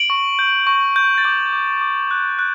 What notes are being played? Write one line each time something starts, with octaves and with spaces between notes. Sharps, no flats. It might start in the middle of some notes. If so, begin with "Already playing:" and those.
Already playing: D7 F#7
C#6
G6
C#6
G6
A6
D6 G6
D6
D6
F#6
F#6